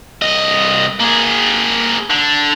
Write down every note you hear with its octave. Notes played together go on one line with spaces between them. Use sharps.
C2 D#5
A#3 G#4
D3